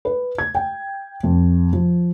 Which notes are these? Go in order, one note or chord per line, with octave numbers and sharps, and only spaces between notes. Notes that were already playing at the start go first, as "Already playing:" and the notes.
B4
G#6
G5
F2
F3